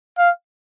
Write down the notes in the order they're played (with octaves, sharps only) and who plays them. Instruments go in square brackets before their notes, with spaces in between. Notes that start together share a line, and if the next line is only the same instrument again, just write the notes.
[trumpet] F5